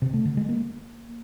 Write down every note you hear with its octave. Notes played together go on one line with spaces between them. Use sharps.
C3
A3
D3
G#3
A#3